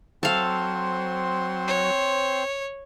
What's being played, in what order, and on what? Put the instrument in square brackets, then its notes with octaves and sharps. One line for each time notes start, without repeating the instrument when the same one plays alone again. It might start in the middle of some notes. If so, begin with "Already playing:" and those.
[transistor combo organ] F#3 [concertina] C4 C5 C6 [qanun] A4 F5
[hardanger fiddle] C#5